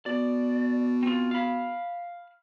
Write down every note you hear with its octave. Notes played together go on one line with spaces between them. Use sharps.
B2 D5
C4 F4
F5 B5